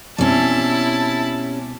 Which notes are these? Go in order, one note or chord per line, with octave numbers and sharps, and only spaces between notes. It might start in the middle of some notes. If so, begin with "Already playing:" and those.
B2 G3 C4 C#4 E4 A5